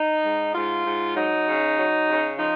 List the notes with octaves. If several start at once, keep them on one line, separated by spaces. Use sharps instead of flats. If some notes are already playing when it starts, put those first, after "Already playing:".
Already playing: D#4
G#2
G#2 F4
G#2
F#3 D#4
C#3
F#3
C#3
F3 D#4